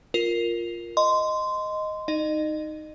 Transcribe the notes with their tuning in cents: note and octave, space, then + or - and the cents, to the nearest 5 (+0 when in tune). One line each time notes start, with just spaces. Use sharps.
F4 +0 A#4 +0
D#5 +0 C6 -15
D#4 +0 D#5 -35